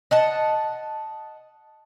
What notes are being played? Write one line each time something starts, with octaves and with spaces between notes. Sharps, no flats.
D#5 F#5 A5